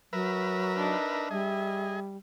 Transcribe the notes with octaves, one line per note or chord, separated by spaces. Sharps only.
F#3 A#4 B4 E5
D4 D#4
G3 G#4 D#5 E5